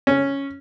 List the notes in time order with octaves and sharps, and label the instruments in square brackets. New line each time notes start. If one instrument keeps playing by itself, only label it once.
[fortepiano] C#4